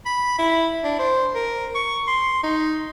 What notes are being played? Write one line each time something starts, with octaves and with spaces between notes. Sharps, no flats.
B5
E4
D4
C5
A#4
C#6
C6
D#4